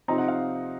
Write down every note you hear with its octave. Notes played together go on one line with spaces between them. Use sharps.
C3 F3 C4 D#4 A#5
F#5
F5